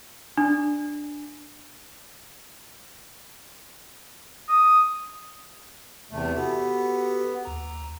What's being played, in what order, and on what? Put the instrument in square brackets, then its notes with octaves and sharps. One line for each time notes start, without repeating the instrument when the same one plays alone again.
[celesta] D4
[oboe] D#6
[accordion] E2 C3 A3
[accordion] B3 [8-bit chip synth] F#4 G4 A4
[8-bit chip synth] D#2 A#5